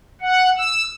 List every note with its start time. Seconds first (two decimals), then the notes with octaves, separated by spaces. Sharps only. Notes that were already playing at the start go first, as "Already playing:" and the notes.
0.21 F#5
0.57 E6